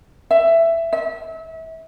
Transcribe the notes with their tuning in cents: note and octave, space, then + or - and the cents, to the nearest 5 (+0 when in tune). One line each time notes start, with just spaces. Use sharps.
E5 +10
E5 -30